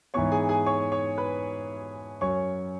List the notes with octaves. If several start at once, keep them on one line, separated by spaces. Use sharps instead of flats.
G#2 E3 B3 C#5 C#6
G#4 G#5
G#4 G#5
C#5 C#6
C#5 C#6
B4 B5
F#2 F#3 C#4 C#5 C#6